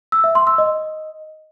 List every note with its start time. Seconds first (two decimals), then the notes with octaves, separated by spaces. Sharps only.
0.12 E6
0.24 E5
0.35 C6
0.47 E6
0.58 D#5